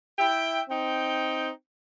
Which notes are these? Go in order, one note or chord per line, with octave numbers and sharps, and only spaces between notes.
E4 E5 G5
C4 D#4 G5